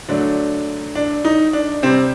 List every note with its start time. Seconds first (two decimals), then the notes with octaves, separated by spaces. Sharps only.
0.08 D3 F#3 A3 D4
0.95 D4
1.25 D#4
1.53 D4
1.82 C3 G3 C4